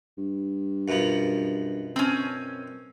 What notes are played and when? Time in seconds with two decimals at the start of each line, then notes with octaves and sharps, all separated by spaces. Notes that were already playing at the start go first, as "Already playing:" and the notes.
0.18 G2
0.88 F#2 B2 F3
1.96 C4 C#4